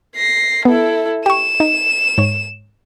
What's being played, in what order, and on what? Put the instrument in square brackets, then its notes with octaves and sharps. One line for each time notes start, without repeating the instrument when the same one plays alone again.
[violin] A#6 C7
[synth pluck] B3 [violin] E4 A4
[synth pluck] G4 C#6 [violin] E7
[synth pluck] D#4
G#2 C#5